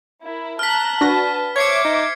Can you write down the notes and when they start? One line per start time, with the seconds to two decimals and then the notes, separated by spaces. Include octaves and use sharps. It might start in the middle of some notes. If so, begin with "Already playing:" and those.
0.21 E4 A#4
0.59 A5 A#5 F6 F#6 B6
1.01 D4 F#4 B4 A5 A#6
1.56 C5 C#5 E5 D6 G#6 C7 C#7
1.85 D#4